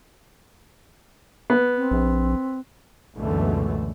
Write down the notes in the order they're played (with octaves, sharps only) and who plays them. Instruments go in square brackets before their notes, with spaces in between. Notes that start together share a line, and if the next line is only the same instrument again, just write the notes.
[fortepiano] B3
[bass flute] C4
[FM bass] A#1
[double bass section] C#2 F#2 B2 D3 E3 A3